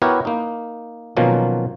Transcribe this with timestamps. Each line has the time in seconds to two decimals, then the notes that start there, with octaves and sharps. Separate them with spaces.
0.02 B3 E4 F#4 G4 A#4 C#5
0.25 A#3 D#4
1.17 B2 D#3 F3 F#3 A#3 C#4